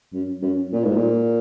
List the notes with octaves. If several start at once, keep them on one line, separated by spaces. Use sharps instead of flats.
F#2
F#2
A#2
G#2
A#2